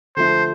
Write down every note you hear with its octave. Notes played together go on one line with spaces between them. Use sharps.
D3 F3 A3 C5